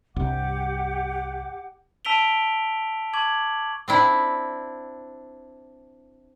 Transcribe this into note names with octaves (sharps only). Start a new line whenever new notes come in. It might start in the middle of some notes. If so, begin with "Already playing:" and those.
C2 G2 G4 F#5 D6
A5 E6 B6 D7 F7 G7
A5 C#6 D6 G#6 F#7
C4 D4 E4